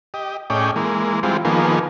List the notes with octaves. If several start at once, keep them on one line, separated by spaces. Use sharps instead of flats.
G4 D#5
A2 C#4 G#4 D5 D#5 G5
E3 G#3 A#3
E3 G3 G#3 C4 F4
D#3 F3 A#3 B3 G#4